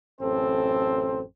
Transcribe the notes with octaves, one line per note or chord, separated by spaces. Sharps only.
A1 F#2 C4 A4 C5